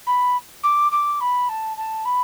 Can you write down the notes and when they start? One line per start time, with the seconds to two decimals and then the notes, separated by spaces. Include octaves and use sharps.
0.07 B5
0.63 D6
0.92 D6
1.20 B5
1.49 A5
1.77 A5
2.05 B5